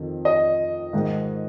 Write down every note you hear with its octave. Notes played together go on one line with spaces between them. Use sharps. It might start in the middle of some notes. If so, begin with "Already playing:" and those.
Already playing: F2 D#3
D#5
G#2 D#3